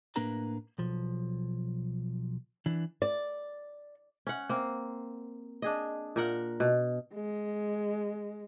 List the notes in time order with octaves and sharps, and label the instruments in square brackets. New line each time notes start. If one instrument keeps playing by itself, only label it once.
[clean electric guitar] A2 A#3 D4 A#4 B4 A#5
B1 F3
E3 D4
[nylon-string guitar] D5
[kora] C#4 F#5
A#3 C4
D4 G#4 D#5
A#2 A#4 F#5
B2
[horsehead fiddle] G#3